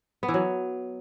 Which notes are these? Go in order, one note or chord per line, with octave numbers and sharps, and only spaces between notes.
B3
E3
F#3